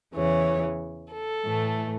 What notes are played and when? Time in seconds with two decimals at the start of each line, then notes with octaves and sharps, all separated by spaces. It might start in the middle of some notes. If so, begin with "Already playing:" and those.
0.14 E2 C#3 E3 C#5
1.11 A4
1.45 A2 E3 A3